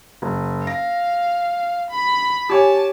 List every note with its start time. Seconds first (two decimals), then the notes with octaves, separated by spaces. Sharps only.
0.22 F#1
0.67 F5 A#6
1.91 B5
2.50 G4 C#5 G#5 A5